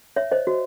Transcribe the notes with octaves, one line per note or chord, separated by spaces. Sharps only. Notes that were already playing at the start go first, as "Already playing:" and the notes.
C#5 E5
C5 D#5
F#4